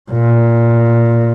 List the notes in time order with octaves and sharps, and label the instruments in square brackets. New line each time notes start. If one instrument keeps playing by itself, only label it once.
[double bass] A#2